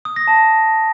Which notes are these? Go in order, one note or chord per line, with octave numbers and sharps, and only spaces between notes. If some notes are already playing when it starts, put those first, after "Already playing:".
D#6
A#6
A5